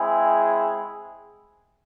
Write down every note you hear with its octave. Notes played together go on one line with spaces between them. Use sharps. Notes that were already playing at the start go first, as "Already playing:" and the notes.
Already playing: G#3 C4 E4 G#4